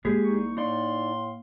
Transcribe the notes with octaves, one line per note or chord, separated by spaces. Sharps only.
G#3 A#3 G4 G#4
C2 D#4 C#6
A2 D#4 D5 F5 C6